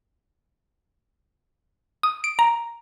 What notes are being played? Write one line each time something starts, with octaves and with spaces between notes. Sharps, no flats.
D#6
D7
A#5